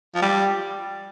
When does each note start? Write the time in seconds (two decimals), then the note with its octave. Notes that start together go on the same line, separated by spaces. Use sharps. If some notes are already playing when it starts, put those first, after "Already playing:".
0.15 F3
0.22 G3